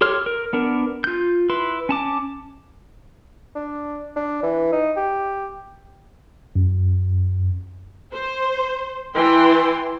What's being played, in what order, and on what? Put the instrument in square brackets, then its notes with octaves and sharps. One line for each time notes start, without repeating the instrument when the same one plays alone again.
[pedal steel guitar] G4 A4 C#5 C6 F6
A#4
B3 D4 A#4
F4 G6
E4 B4 C6
C#4 A5 D6
[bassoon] D4
D4
E3
D#4
G4
[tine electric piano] F#2
[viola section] C5
E3 G5 C6